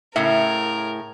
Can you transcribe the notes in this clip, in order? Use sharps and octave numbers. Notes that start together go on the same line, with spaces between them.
A2 C#3 A#4 E5